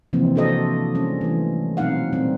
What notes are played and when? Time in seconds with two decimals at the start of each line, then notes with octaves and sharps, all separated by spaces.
0.13 C3 E3 F3 G#3 A#3 C4
0.36 D4 F#4 A4 C5 D#5
0.95 G3 G#3 C#4
1.21 E3 A3
1.77 B2 F#3 C4 D#4 F5 F#5
2.12 A#2 G3 C4